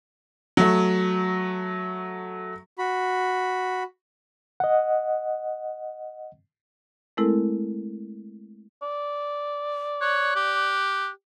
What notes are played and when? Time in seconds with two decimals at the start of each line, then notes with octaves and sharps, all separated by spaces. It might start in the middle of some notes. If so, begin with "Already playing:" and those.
0.57 F#3 A3
2.78 F#4 B5
4.60 D#5 F#5
7.17 G#3 A3 C4 E4 A4 A#4
8.82 D5
10.01 C#5 F#6
10.36 G4